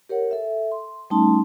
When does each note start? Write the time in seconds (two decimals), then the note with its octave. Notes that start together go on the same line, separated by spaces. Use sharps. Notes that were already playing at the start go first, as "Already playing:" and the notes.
0.09 G4 A#4 C#5 F#5
0.31 A4 E5
0.72 C6
1.10 G3 A3 C#4 D#4 A5 C6